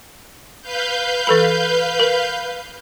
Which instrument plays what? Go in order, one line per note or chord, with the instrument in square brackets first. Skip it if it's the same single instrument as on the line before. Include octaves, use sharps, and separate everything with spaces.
[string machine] B4 F5 G6
[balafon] E3 A4 B5
A#4